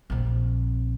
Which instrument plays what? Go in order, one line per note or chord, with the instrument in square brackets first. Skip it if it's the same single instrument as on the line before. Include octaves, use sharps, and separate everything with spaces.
[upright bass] A#1 C4